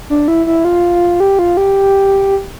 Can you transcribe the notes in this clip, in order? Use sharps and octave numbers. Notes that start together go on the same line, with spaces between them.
D4
E4
E4
F4
G4
F4
G4